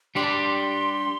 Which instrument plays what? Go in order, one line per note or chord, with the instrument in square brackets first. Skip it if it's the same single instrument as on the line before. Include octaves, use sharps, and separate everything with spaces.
[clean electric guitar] G3 D4 G4 D5 [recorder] C6
[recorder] A5
C6